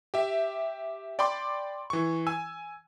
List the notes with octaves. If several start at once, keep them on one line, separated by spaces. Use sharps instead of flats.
G4 E5
D5 G5 B5 C6 D6
E3 C#6
G#5 E6